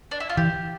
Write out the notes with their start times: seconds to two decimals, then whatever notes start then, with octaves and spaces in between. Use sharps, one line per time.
0.11 D4
0.20 E4
0.29 F4
0.37 E3 G4